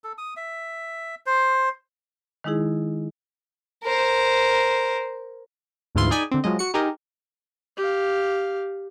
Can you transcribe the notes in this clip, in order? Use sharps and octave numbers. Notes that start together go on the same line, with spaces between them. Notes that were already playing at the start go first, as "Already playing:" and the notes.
A4
D#6
E5
C5
D#3 G#3 D#4 E4 G#4
A#4 C5
D2 G#2 E3 E4 F4 C6
D#4 G#4 D5 G5 G#5 B5
D3 C4
F3 F#3 G#3 D#5
F#4 C#7
D#4 G4 G#4 A#4 D#5
G4 F5